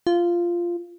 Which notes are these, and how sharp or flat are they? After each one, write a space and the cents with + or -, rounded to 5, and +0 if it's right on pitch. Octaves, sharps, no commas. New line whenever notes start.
F4 -10